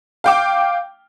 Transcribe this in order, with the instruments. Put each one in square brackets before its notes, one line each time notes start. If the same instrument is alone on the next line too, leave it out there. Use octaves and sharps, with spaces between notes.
[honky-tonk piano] F5 G5 D6